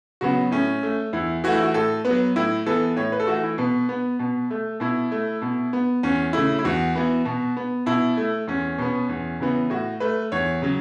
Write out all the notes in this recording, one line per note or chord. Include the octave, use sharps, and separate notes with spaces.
C#3 F#3 B3 F#4
A2 C#4
A3
E2 E4
E3 A3 F#4
E4
F#4
A2 A4
B3 B4
F#3
A2 E4
E3 B3 A4
A2 C#5
B4
A4
E3 A3 F#4
E4
B2 B4
B3
B2
A3
B2 E4
A3
B2
B3
E2 C#4
C#3 A3 E4
E4
E2 F#4
E3 B3
B2
B3
B2 E4
A3
E2 C#4
B2 B3
E2
C#3 E3 B3
A2 F#4
A3 B4
E2 C#5
C#3 F#3